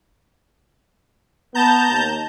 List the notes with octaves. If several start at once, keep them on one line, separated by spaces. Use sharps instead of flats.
B3 A5 A#5 G6
D#2